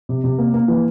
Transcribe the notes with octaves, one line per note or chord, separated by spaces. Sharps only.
C3
C3
A#3
A#3
E3